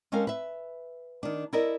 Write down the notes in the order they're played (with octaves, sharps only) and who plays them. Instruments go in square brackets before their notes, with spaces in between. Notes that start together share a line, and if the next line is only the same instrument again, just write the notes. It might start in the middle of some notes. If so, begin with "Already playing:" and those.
[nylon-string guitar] G#3 C#4 G4 A4 A#4 F5
B4 E5
D#3 D4
E4 A4 A#4 D5 D#5